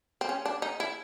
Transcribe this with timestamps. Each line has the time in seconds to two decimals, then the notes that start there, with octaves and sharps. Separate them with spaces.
0.21 C4
0.29 C#4
0.45 D4
0.62 D#4
0.80 E4